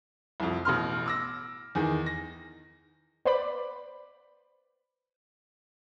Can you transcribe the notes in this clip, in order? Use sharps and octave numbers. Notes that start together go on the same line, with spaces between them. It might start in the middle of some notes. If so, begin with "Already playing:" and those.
C2 F2
A1 B2 C6 F6
D6 E6 A#6
E2 D#3 G#4
A#6
B4 C5 D5 B5 D6